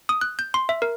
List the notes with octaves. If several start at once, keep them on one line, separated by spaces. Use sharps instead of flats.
D#6
F#6
G6
C6
E5
A#4